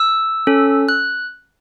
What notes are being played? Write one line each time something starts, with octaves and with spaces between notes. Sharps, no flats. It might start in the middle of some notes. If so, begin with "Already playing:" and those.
Already playing: E6
C#4 A4
F#6